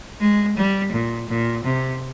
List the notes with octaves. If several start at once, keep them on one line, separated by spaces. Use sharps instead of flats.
G#3
G3
A#2
A#2
C3